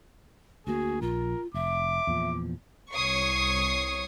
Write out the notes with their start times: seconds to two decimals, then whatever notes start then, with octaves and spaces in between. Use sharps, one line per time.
0.67 D2 A#3 F#4 G#4
1.02 A#1 F4 A#4
1.54 F1 E5 D6
2.07 E2 A#2 F3
2.92 C2 C#5 C#6 D#6 C7